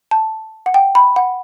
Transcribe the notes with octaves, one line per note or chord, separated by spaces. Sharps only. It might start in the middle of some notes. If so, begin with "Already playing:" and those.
A5
F#5
G5
B5
F#5